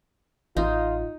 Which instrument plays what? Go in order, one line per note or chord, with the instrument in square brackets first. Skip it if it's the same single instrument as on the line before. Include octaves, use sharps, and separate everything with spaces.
[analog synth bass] A1 [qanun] D#4 [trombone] F4